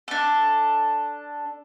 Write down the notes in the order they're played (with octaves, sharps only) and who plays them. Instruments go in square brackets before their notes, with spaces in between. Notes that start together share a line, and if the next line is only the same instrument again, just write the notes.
[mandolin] D4 A4